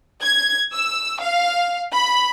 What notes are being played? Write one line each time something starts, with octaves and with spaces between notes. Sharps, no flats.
G#6
E6
F5
B5